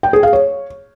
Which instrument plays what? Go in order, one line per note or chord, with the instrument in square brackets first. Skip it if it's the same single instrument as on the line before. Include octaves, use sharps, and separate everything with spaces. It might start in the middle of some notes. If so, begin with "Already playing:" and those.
[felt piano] G5
G#4
F5
C#5